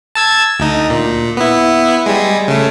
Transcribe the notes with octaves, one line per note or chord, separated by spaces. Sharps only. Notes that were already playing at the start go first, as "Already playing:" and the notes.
A5 E6 G#6
D2 D#4
A#2
B3 E4
G3 G#3
C#3 A3